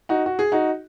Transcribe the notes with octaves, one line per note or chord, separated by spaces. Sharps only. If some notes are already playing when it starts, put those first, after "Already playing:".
D#4 F#4
F#4
G#4
D#4 F#4